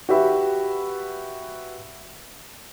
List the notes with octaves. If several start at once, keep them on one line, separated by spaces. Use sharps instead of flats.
F#4 G4 B4 E5 B5